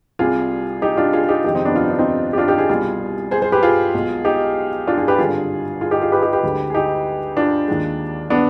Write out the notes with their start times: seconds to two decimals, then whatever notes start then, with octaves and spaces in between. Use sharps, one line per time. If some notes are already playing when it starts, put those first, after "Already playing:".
0.19 C2 C3 G3 F4 G#4
0.82 D#4 G4
0.97 D4 F4
1.13 F4 G#4
1.23 G#4
1.29 D#4 G4
1.44 F1 F2 D#3 G#3 D#4 G4
1.55 C4 D#4
1.65 B3 D4
1.76 F4
1.84 D#4
1.91 D4
1.99 C4 D#4
2.33 G4
2.38 D4 F4
2.48 D#4 G4
2.58 F4 G#4
2.69 C2 B2 G3 F4 G#4
3.31 G#4 C5
3.42 G#4 C5
3.52 G4 B4
3.63 F4 G#4
3.94 B1 B2 G#3
4.25 D#4 G4
4.87 D4 F4
4.98 F4 G#4
5.08 G4 B4
5.18 G#1 G2 D3 F4 G#4
5.81 F4 G#4
5.91 D#4 G4
6.02 F4 G#4
6.12 G4 B4
6.22 D#4 G4
6.33 G4 B4
6.43 D2 D3 G#3
6.70 G#4
6.74 D#4 G4
7.37 D4 F4
7.68 D#2 D#3 G#3
8.30 B3 D4